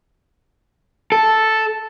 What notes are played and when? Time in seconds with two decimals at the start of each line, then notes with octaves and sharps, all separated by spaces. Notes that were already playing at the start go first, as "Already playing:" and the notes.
1.12 A4